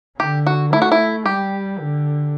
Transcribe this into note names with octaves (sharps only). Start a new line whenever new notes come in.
D3 G4
F#4
A3 E4
F#4
E4
G3 G4
D3